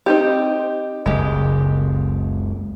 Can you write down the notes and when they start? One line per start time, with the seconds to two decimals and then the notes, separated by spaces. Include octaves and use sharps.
0.06 C4 D#4 G4
1.06 F#1 C#2 G#3 G4